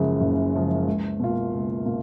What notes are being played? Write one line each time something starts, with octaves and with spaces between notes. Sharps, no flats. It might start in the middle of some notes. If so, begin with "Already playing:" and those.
Already playing: F#1 F#2 C#3 F3 G#3
F#1
F#2 C#3 F3 G#3
C#2
B2 A#3 F4
C#2
B2 A#3 F4